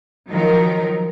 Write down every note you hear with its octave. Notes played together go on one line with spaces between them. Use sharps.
D#3 F3 F#3 D#4 A#4